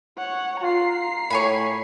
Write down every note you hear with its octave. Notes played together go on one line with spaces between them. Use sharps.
C#5 F#5
F4 A#5 C7
A2 C#5 G#5 B5